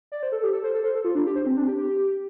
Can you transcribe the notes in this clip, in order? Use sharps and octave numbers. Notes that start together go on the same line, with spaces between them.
D5
C5
A4
G4
A4
C5
A4
C5
A4
F4
D4
G4
C5
C4
D4
G4
G4